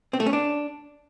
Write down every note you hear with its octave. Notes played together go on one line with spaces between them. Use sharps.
C4
A3
C#4
D4